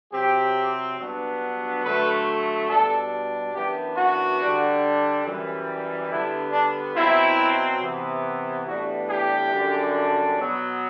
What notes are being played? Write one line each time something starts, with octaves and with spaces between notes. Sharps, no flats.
C3 F#3 C4 G4
G2 F#3 B3 D4
D3 F#3 A3 B4
B2 G3 D4 A4
F#2 E3 B3 D4 G4
F#4
D3 G3 D4
F#2 E3 G3
D3 G3 B3 D4 E4
D4
B2 F#3 C4 E4
C3 E3 B3
A2 E3 G3 B3 D4 F#4
G4
F#2 D3 G3 D4
B2 F#3 B3